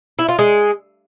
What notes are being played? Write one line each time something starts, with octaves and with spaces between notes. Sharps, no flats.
E4
F4
G#3